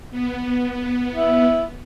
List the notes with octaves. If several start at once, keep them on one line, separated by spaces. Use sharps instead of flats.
B3
E4